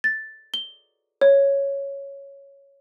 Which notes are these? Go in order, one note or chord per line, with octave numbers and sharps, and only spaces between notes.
A6
G7
C#5